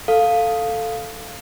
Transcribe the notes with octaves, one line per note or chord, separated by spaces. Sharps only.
A4 F5